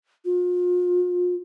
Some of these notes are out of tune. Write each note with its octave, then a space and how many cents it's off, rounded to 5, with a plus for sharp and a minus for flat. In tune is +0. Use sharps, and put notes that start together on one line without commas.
F4 +40